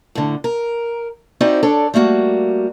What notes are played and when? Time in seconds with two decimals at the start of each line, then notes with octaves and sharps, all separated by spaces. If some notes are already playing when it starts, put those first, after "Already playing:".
0.15 A2 D3
0.44 A#4
1.41 C4 D#4 E4 F#4 C5 D5
1.63 D4 A4 C#5 D5
1.94 G3 A3 A#3 F#4